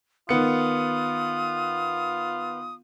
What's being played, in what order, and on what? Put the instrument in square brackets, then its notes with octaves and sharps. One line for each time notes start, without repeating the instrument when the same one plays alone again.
[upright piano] D#3 B3 C#7 [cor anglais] F4 [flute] D#6